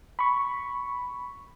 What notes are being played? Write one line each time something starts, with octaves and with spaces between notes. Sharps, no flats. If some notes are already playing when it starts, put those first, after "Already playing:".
B5 C#6